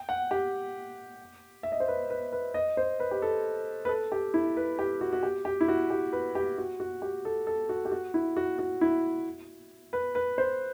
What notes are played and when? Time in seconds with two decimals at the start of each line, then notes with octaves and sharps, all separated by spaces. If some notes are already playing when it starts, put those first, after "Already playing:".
Already playing: G5
0.09 F#5
0.31 G4
1.63 E5
1.72 D#5
1.80 C5
1.88 B4
2.10 B4
2.32 B4
2.54 D#5
2.77 C5
3.00 B4
3.11 G4
3.22 A4
3.85 B4
3.89 A4
4.12 G4
4.34 E4
4.57 B4
4.79 G4
5.01 F#4
5.13 F#4
5.23 G4
5.45 G4
5.61 E4
5.68 F#4
5.90 G4
6.13 B4
6.35 G4
6.58 F#4
6.80 F#4
7.02 G4
7.25 A4
7.47 A4
7.69 F#4
7.85 G4
7.92 F#4
8.14 E4
8.37 F#4
8.59 F#4
8.81 E4
9.93 B4
10.15 B4
10.38 C5